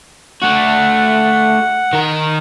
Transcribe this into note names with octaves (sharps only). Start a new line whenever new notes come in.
A3 F#4 F#5
D#3 A#4